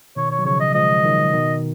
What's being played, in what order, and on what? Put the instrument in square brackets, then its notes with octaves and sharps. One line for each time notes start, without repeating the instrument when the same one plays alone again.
[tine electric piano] B2 D#3 [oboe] C#5
[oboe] C#5
[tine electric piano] F#3
[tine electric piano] C#3 F3 [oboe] C#5
[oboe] D#5
[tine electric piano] F3 G#3 [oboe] D#5
[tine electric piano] D#3 F#3
B2 D#3